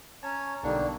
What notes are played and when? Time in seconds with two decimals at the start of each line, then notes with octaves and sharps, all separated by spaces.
0.23 C#4 C#5 A5 A#5
0.64 B1 D3 G3 A#3 B3 D4 D#4 C#6